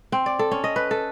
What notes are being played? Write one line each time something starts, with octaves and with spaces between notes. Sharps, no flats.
C4
D5
A4
C#4
D#5
B4
A4